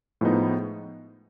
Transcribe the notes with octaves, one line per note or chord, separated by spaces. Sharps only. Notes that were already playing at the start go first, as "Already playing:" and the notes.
A2 F3 G#3 B3 D#4